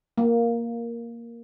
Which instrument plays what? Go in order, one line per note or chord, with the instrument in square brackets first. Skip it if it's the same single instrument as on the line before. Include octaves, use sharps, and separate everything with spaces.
[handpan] A#3